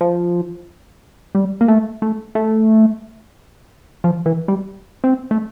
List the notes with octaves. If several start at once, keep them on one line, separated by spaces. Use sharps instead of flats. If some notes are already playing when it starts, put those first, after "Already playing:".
F3
G3
A#3
A3
A3
A3
F3
E3
G3
C4
A3